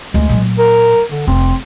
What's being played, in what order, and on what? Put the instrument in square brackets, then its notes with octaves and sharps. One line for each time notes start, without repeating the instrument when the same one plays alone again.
[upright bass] D2 [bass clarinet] G#3
[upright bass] A#2 F#3
[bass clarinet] A#4
D3
[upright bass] F1 [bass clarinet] C4